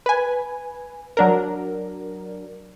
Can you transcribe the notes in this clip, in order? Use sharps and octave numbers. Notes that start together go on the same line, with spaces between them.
B4 G#5
F#3 D4 A#4